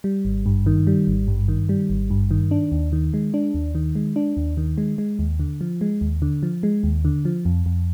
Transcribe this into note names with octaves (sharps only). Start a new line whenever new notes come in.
G3
G#1
G2
D#3
G3
G#1
G2
D#3
G3
G#1
G2
D#3
D4
D#2
D#3
G#3
D4
D#2
D#3
G#3
D4
D#2
D#3
G#3
G#3
D#2
D3
F3
G#3
D#2
D3
F3
G#3
D#2
D3
F3
F2
F2